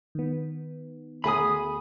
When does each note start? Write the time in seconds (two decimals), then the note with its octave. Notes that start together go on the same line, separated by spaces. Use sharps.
0.15 D#3 B3
1.24 D2 G#4 G#5 B5 D#6